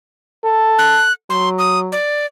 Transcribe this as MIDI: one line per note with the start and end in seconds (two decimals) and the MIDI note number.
0.44 1.02 69
0.79 1.12 90
1.30 1.93 54
1.30 1.49 84
1.59 1.79 87
1.92 2.26 74